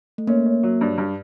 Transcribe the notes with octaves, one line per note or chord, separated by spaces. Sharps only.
A3
A#3 C#4
C#4
F#3
G2
G2